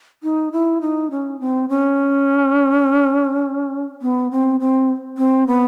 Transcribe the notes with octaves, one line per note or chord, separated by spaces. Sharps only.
D#4
E4
D#4
C#4
C4
C#4
B3
C4
C4
C4
B3